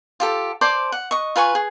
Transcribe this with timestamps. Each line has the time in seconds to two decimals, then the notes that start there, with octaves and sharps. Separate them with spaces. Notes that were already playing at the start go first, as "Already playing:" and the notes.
0.20 F4 G4 A4
0.61 C5 D5 A5 D6
0.92 F#5
1.11 D#5 C#6
1.36 F4 B4 G#5 C#6
1.55 G#4